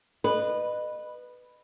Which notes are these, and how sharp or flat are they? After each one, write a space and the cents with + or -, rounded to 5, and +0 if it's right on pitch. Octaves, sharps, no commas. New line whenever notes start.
B4 +0 D#5 -30